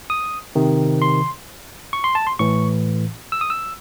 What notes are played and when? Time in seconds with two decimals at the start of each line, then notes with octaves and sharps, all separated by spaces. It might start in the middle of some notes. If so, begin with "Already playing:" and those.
0.10 D#6
0.56 C3 D#3
1.02 C6
1.93 C#6
2.04 C6
2.15 A5
2.27 C6
2.39 A2 E3 C#6
3.32 E6
3.41 D#6
3.50 E6